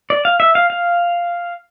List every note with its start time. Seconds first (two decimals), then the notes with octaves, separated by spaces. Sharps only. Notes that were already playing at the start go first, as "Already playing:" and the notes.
0.10 D5
0.25 F5
0.40 E5
0.55 F5
0.70 F5